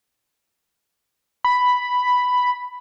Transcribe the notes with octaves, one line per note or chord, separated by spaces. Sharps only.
B5